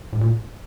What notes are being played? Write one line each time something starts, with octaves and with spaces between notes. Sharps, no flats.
A2
A#2